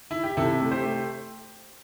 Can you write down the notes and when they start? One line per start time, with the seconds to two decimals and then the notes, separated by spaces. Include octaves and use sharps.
0.11 E4
0.23 G4
0.37 C3 E4 A4
0.60 A3
0.71 G4 C5
0.83 A3